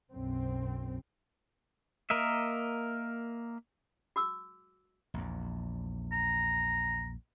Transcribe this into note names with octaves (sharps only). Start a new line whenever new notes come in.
B1 F#2 C4
A#3 A#4 D#5 E5
F#4 D6 E6
A#1 E2
A#5